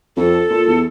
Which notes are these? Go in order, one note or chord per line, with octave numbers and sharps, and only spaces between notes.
F2 A4
A#2
E2